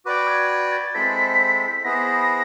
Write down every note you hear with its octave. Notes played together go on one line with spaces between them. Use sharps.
F#4 B4 D5 G5 D6
G#6
G#6
A6
G#3 C4 E4 A4 C5 B6
B3 E4 G#4 C5 A#6